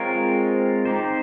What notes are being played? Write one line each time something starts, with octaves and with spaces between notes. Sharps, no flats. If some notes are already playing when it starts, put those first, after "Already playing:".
Already playing: G#3 C4 F4 A#4 C#5
C4 D#4 G4 C5